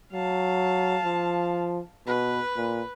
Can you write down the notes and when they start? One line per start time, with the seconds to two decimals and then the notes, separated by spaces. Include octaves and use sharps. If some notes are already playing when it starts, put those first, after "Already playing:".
0.13 F#3 F5 A5
1.05 F3
2.07 B2 B4
2.56 A#2